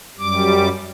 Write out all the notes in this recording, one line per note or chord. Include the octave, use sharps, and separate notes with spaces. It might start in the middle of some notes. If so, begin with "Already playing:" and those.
F#2 G3 D6